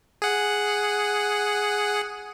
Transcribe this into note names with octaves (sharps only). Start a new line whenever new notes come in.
G#4 F#5